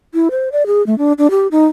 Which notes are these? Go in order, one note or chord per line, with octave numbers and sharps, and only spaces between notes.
E4
C5
D5
G#4
A3
D4
D4
G4
D#4